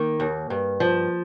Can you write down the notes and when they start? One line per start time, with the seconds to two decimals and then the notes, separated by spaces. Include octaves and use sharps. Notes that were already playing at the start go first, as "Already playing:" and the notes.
Already playing: D#3 A#3
0.20 D#2
0.50 G2
0.80 F3